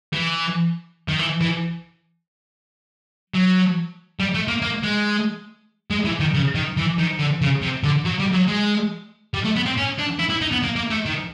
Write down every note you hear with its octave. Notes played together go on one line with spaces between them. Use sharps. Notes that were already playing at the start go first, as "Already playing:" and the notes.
E3
D#3
E3
E3
F#3
G3
A3
A#3
A#3
G#3
G#3
E3
D#3
C#3
D#3
E3
D#3
D3
C#3
C3
D3
F#3
G3
F#3
G#3
G3
A3
B3
C4
C#4
D4
E4
E4
D#4
B3
A#3
A#3
A3
D#3